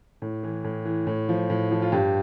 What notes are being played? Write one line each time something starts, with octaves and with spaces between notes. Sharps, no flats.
A2
E3
A2
E3
A2
F3
A2
F3
F4
G2 G4